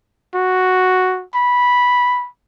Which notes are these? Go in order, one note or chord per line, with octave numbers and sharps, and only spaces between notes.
F#4
B5